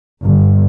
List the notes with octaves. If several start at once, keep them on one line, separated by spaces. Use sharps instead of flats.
G1